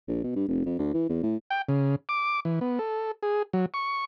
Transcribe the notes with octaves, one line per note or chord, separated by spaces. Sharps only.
A#1
B2
G2
F1
F2
D2
E3
E2
A2
G5
C#3
D6
E3
B3
A4
G#4
F#3
C#6